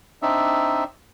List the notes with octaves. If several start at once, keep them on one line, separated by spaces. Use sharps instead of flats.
C4 D4 D#4 E5